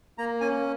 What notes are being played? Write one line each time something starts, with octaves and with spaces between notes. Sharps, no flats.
A#3 A#5
C#4 G#5